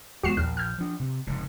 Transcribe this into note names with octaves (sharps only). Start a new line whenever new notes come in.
E2 G#3 B3 F#4 C7 E7
A#1 E2 F6
F6 G6
F3 D4
C3
F1 G#2 C#3